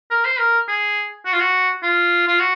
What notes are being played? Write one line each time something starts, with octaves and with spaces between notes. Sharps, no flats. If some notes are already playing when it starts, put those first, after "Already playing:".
A#4
C5
A#4
G#4
F#4
F4
F#4
F4
F4
F#4